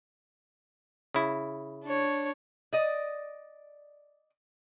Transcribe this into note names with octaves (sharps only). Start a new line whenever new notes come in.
C#3 E4
D4 C#5
D5 D#5